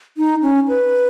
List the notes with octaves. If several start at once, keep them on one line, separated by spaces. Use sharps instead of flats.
D#4
C#4
B4